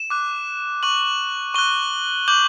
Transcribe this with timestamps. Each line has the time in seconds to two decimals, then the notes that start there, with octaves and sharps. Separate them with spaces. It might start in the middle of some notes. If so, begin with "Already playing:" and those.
Already playing: E7
0.10 D6 F#6
0.83 C#6 F#6 F#7
1.54 C#6 F#6 G7
2.28 D6 G6 F#7